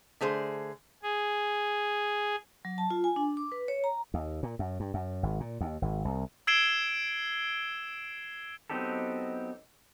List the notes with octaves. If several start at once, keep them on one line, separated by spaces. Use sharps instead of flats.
D3 A3 G#4 C5
G#4
F#3
A5
F4
G#5
D4
D6
B4
C#5
A#5
D#2
A#2
F#2
G2
F#2
G#1
A#2
D#2
G#1
C2
E6 G#6 C7 D7 E7 G7
F#3 B3 C4 D#4 G4 A4